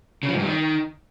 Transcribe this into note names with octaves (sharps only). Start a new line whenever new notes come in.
C#3
F3
G#2
G2
D#3